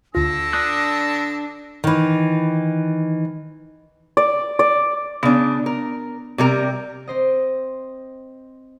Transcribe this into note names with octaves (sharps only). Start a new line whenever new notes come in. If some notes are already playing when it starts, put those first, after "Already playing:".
D2 D3 F4 A5 E6 A#6
D4 D#6 F#6
D#3 E3
D5
D5
C#3 B3 D4
A#4
C3 G3 A#4
C4 C5 D#5